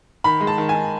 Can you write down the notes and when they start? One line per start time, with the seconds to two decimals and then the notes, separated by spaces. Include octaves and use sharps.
0.24 D#3 B5
0.41 G#3
0.47 A5
0.58 D#3
0.69 G#5
0.74 D#3